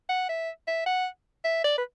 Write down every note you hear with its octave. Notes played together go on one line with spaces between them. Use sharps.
F#5
E5
E5
F#5
E5
D5
B4